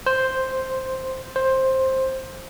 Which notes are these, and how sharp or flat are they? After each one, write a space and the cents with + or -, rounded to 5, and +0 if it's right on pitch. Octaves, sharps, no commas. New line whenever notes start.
C5 +0
C5 +10